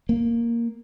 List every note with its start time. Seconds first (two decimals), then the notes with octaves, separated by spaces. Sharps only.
0.09 A#3